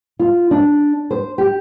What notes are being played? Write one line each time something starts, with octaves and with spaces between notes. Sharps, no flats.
F4
D4
C5
G4